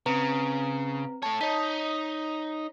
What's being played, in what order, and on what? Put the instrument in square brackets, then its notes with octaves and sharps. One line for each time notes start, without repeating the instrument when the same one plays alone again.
[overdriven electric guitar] C#3 [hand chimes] C4 B4 A#5
[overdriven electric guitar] A3 C#5 [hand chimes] A5
[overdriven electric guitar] D#4 [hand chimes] C#5 B6